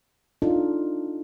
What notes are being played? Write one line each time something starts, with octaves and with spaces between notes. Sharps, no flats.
D4 D#4 F4 A4